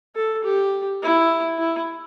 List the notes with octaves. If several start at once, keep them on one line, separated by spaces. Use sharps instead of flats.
A4
G4
E4
E4